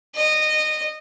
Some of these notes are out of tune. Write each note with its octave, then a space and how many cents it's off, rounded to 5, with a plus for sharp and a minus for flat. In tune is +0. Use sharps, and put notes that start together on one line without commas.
D#5 -20